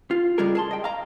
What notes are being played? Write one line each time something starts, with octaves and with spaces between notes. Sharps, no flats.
F4
C#3 G3 G#3 F4 G#4 A#4
G#4 A5 C6
D#5 G5
F5 A#5